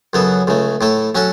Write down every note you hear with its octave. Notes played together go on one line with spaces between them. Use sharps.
F#2 C#3 F#3 B3 A4
C#2 C#3 A3
A2 A3 E4 A4
F#3 C#4 F#4 A4